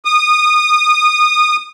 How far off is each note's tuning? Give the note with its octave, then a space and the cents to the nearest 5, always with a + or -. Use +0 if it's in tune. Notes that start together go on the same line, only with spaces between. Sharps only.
D#6 -20